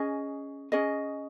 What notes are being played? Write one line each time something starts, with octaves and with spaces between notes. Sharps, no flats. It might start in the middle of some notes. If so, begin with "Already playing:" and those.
Already playing: C#4 G#4 D#5
C#4 G#4 D#5